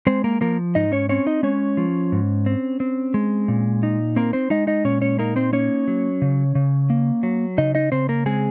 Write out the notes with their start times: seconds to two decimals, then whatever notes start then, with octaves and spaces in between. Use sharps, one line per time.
0.07 G#3 C4 C5
0.24 A#3 A#4
0.41 F3 A#3 A#4
0.75 G#2 D#4 D#5
0.92 C#4 C#5
1.09 C4 C#4 C#5
1.27 D#4 D#5
1.43 G#3 C#4 C#5
1.77 F3
2.12 G#2
2.46 C4
2.80 C4
3.14 G#3
3.48 A#2
3.83 D#4
4.16 A#3 C4 A#4
4.33 C4 C5
4.50 G#3 D#4 D#5
4.67 D#4 D#5
4.84 A#2 C#4 C#5
5.01 C#4 C#5
5.19 A#3 D#4 A#4
5.36 C4 C5
5.53 A#3 C#4 C#5
5.88 F#3
6.22 C#3
6.55 C#3
6.90 A#3
7.23 F#3
7.58 C#3 D#4 D#5
7.75 D#4 D#5
7.92 C#3 C4 C5
8.09 A#3 A#4
8.26 G#3 C4 G#4